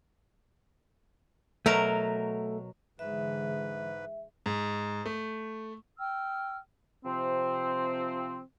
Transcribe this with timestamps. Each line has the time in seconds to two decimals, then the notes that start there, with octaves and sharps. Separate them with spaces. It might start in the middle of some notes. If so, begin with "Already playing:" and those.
1.66 B2 F#3 A3 A#4
2.99 G#2 D3 E3 G#3 B4 E5
4.46 G#2
5.06 A3
5.98 G5 E6 F6
7.05 C3 F3 C4